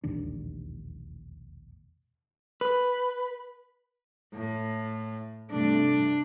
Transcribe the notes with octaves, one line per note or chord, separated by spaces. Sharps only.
E1 A#1 D#2 D4
B4
A2
G2 C3 A3 D4